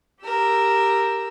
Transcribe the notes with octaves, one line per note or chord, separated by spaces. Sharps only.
G4 A#4 E6